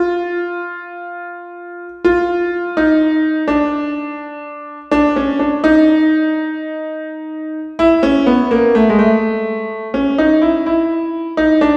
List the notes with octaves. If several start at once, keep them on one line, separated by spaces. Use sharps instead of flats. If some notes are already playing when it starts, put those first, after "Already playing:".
Already playing: F4
F4
D#4
D4
D4
C#4
D4
D#4
E4
C#4
B3
A#3
A3
G#3
A3
C#4
D#4
E4
E4
D#4
D4